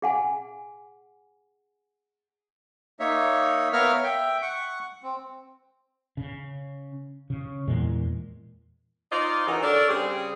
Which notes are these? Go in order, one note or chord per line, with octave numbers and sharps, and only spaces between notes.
G#4 F#5 G#5
A#3 D#4 C#5 E5
B3 A#4 C#5 E5 F5 F6
E5 G5
F#5 C#6
C4
C#3
C#3
E2 A#2 G#3
D#4 F4 C5 D5 D#5
C#3 E3 C#4 D#4 F#4 A#4
D4 A4 A#4 C#5 D5
C#3 G3 C4 G#4